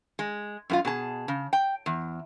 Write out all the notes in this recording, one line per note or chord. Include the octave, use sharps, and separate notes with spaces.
G#3
F#2 A#3 F4
B2 G#4 A5
C#3
G5
E2